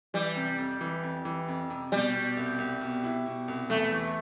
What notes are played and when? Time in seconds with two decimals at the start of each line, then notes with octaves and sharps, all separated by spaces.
0.14 E3 G3
0.36 C3
0.58 F2
0.81 E3
1.03 F2
1.25 E3
1.48 F2
1.70 C3
1.92 B2 G3
2.14 B2
2.37 C2
2.58 C2
2.81 B2
3.04 E4
3.26 B2
3.48 C2
3.70 E2 A3
3.92 E3